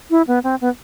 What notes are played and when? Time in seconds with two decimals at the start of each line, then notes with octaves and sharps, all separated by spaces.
0.10 E4
0.27 B3
0.44 C4
0.61 B3